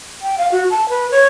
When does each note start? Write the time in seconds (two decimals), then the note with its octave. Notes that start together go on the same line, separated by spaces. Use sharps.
0.22 G5
0.38 F5
0.52 F#4
0.70 A5
0.89 B4
1.11 C#5